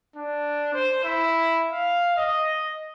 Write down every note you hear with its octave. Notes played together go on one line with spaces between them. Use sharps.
D4
C5
E4
F5
D#5